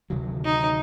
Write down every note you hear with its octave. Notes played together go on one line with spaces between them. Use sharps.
D2 C3 D#3 F#3
D#4